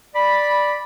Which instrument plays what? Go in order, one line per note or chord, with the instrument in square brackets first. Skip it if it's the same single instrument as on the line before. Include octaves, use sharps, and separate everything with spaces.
[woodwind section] D5 B5